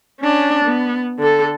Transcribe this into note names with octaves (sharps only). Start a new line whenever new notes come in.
C#4 D4
B3
D3 A4